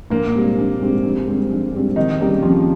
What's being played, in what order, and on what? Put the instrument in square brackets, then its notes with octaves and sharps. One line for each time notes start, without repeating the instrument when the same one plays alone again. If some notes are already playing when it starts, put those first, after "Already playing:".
[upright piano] A#1 [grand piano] A#2 A#3
[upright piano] G#2 G3 C4
A#1
G#2 G3 C4
A#1
G#2 G3 C4
A#1
G#2 G3 C4
[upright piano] F2 [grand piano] D#3 D#4
[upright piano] C#3 G3 A#3
[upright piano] F2 [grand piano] F3 F4